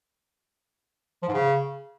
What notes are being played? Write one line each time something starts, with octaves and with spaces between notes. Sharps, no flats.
F3
G#2
C#3